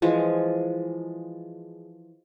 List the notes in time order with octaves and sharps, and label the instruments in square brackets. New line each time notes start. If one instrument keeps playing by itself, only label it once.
[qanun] E3 F3 G#3